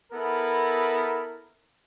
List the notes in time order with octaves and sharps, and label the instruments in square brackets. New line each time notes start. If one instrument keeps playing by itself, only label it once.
[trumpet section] B3 E4 A4 A#4